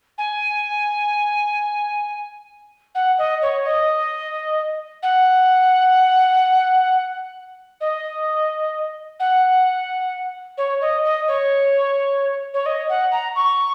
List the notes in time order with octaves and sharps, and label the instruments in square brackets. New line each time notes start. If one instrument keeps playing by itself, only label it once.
[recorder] G#5
F#5
D#5
C#5
D#5
F#5
D#5
F#5
C#5
D#5
D#5
C#5
C#5
D#5
F#5
A#5
C#6